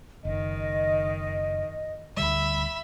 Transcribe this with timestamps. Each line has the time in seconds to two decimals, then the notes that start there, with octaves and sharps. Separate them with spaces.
0.25 F#1 D#3 D#5
2.17 D2 D3 G3 E5 B5